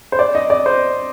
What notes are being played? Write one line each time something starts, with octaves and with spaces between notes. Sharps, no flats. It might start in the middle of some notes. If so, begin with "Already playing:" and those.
C5
D5
D#5
D5
C5